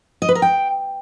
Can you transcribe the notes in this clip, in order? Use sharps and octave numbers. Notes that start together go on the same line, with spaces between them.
D#5
B4
A#4
G5